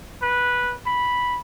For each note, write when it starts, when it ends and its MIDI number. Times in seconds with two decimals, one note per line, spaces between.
0.22 0.74 71
0.86 1.40 83